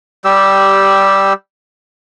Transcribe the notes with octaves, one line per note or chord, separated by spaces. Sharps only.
G3 G4 E6